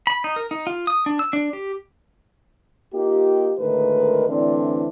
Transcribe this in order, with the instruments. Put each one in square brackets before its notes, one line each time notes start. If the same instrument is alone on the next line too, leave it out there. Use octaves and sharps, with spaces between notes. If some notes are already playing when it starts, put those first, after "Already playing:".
[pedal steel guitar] B5
D#4
A#4
D#4
F4
D#6
D4
E6
D4
G4
[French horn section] A#3 D#4 F4 G4
D2 A2 D#3 G#3 A#4 B4
A2 D3 E3 C4 D4 D5